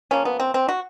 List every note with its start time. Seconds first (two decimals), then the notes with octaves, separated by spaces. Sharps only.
0.11 C#3 F3 A#3 C#4
0.25 B3
0.40 C4
0.54 C4
0.69 F#4